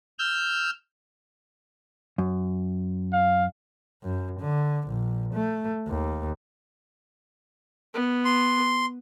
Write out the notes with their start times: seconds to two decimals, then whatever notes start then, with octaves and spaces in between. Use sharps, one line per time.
0.19 E6 F6 G6
2.18 F#2
3.13 F5
4.03 F#2
4.40 D3
4.88 A#1
5.34 A3
5.88 D#2
7.94 B3
8.25 C6